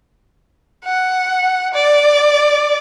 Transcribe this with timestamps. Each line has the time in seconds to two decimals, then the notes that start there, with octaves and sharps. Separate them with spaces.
0.85 F#5
1.74 D5